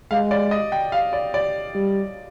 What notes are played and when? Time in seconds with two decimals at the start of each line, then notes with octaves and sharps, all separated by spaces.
0.11 G#3 F5
0.31 D5
0.51 D#5
0.72 G5
0.92 F5
1.13 D5
1.34 D5
1.75 G3